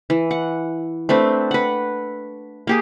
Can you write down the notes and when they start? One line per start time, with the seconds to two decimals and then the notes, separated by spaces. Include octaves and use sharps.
0.10 E3
0.31 F#5
1.09 A3 C4 D4 B4
1.51 B4 F#5
2.67 A#3 G4 G#4